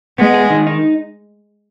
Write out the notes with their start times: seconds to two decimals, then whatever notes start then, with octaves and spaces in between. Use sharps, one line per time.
0.18 G#3 B3
0.34 G#4
0.50 D#3
0.67 D#4